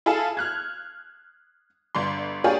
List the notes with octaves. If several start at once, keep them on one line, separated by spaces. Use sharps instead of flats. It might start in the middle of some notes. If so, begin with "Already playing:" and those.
E4 G#4 A4 F5 A5
F6 F#6 G#6
G1 D3 C6
A#3 D4 F4 G4 G#4 C#5